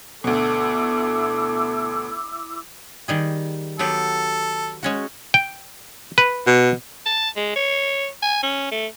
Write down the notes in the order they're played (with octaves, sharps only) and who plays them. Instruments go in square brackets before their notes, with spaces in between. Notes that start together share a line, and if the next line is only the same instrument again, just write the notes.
[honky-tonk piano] D2 B2 [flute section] E4 D6 E6 [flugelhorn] A4
[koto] D#3 G3 G#4
[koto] F#3 B3 G4 [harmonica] A4
[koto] G#3 C#4 F#4
[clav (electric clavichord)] G5
B4
[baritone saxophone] B2
[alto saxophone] A5
G#3
C#5
G#5
C#4
A3